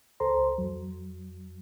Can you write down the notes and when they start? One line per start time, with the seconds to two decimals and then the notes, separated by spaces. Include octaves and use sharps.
0.20 C#2 A4 C5 A#5 C6
0.58 F2 F#3